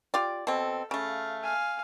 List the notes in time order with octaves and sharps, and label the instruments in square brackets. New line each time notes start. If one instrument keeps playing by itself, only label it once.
[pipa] F4 G4 D5
[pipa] B2 C4 [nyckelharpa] A4
[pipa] C#3 A3 [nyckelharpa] F5
[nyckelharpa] F5 G#5